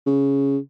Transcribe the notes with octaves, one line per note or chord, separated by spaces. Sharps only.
C#3